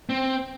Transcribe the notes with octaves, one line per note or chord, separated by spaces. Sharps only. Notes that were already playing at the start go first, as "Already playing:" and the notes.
C4